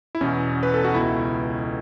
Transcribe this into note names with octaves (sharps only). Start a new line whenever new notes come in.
E4
E2 B2 C#4
B4
A4
F#4
C#2 B2 E4